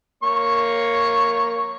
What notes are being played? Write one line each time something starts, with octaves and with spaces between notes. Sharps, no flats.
A#3 C#5 C#6